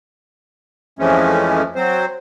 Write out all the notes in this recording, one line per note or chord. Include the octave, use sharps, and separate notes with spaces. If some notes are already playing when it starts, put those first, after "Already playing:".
F2 E3 F3 G#3 A3 C#4
F#3 C4 C5